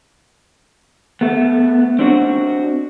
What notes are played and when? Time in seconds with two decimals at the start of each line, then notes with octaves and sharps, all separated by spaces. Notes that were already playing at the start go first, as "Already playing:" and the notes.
1.21 A3 B3
1.99 C4 D4 F#4